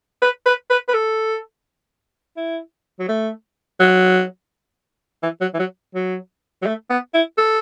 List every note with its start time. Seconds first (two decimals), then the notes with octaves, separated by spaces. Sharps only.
0.22 B4
0.46 B4
0.70 B4
0.88 B4
0.94 A4
2.37 E4
2.99 F#3
3.09 A3
3.80 F#3
5.23 E3
5.41 F#3
5.54 E3
5.59 F#3
5.95 F#3
6.62 F#3
6.66 A3
6.90 B3
7.14 E4
7.38 A4